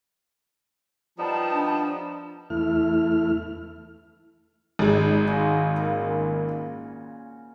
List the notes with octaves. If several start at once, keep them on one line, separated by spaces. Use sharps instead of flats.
F3 G3 B3 D#4 A5
D4
E2 A3 E4 F6
G#1 G#3
C#4 F4 F#4
A#2 C#3